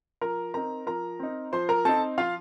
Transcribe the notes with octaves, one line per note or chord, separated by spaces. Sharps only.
F3 A#4 A#5
C4 D#4 A#4 A#5
F3 A#4 A#5
C4 D#4
F3 C5 C6
A#4 A#5
C4 D#4 A4 A5
F3 F4 F5